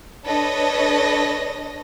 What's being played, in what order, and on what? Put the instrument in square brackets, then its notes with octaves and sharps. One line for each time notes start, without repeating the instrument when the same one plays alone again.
[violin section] D4 A4 B4 C#5 D#5 A#6